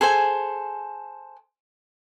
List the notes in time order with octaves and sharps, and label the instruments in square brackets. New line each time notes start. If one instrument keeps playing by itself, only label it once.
[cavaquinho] G#4 A4 C5 G#5